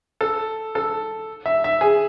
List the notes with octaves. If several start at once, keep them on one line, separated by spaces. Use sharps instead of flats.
A4
A4
E5
E5
G#4